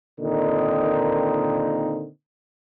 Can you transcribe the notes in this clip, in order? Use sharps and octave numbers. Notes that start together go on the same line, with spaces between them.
A#2 D3 D#3 A#3 C4 D#4